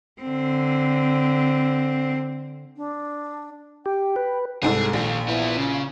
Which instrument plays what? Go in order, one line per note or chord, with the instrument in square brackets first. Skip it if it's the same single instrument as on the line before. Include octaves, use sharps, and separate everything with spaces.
[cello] D3 C4
[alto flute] D4
[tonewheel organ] G4 [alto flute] G5
[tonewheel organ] B4
[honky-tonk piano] C2 G#2 A4 [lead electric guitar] G#4
[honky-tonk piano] A#1 [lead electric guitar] D#2
[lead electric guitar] B3 E4
C#3